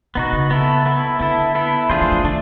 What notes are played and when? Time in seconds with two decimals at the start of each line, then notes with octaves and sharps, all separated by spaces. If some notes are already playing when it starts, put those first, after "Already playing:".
0.15 B2 B3 D#4 F#4
0.33 C#3
0.51 B3 E4 A4
0.86 B3 E4 A4
1.19 D3 B3 E4 A4
1.55 B3 E4 A4
1.90 E3 A3 D4 F4 G#4 C5
2.01 F3
2.12 F3
2.24 D#3 A3 D4